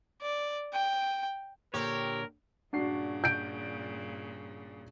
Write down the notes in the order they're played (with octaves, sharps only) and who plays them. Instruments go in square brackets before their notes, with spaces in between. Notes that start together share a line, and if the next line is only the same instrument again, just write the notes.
[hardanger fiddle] D5
G5
[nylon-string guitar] A#2 D3 [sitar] C4 G4 [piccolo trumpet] A#4 [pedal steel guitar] C#5
[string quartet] G2 A#2 C#3 [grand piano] D4 F#4 C7
[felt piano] G6 D7